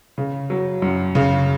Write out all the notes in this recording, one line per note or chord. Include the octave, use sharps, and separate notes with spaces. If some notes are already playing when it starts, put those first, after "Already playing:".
C#3
F#3
F#2
C#3